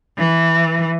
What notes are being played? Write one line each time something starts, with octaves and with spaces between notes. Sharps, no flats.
E3